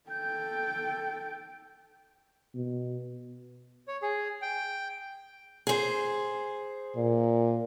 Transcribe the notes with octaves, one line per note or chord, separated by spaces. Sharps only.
A4 G5 G6
B2
C#5
G#4
G5
G#4 C5
A#2